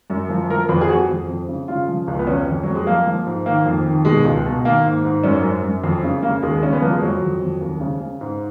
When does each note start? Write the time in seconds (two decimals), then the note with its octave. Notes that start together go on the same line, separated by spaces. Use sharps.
0.10 F#2
0.30 F3
0.50 F3 A#4
0.69 F2 B4
0.81 G#4
0.89 F2 F#4
1.09 F2
1.28 F2
1.48 C#3
1.68 C#3 F4
1.89 F3
2.08 C#2
2.19 B3
2.27 F2 C#4
2.47 F2
2.63 F2 F#3
2.75 G#3
2.87 F3 A#3
3.07 F3
3.27 G#2
3.46 D#3 A#3
3.66 F2
3.86 D#3
4.05 B2 G#3
4.25 C#2
4.46 B2
4.65 D#3 A#3
4.85 G#2
5.05 G#2
5.23 F#2 C#4
5.44 F#2
5.63 F#2
5.84 F2
6.04 C#3
6.22 C#3 A#3
6.42 D#2 G#3
6.63 C#3 C#4
6.73 B3
6.82 F3 A#3
6.92 G#3
7.02 F2 F#3
7.22 F2
7.41 F2
7.61 D#2
7.80 C#3
8.00 C#3
8.21 G#2